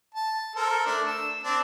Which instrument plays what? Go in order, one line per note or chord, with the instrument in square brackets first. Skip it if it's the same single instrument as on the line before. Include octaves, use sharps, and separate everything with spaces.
[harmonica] A5
A4 A#4 C5
A3 D4
E6
C4 D4